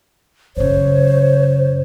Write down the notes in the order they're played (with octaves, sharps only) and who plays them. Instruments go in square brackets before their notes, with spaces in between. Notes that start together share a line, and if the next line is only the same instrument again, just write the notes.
[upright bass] F#2 C#3 [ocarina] C5 [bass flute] C#5